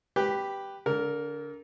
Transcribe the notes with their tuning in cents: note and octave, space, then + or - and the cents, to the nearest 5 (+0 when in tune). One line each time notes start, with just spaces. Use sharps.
G4 +0 B4 +0 G5 +0
D3 -35 A#4 +0